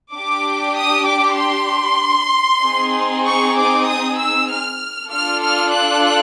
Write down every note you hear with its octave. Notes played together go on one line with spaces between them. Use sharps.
D4 G4 D6
D#6
D6
C6
C4 D#4 G#4
C#6
D6
D#6
E6
F6
D4 F4 A4 F6
F6
F#6